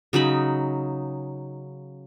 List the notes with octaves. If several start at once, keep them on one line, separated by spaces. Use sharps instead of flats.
C#3 F#3 D#4 B5